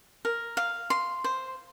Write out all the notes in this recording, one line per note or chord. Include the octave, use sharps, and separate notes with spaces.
A#4
F5
C6
C5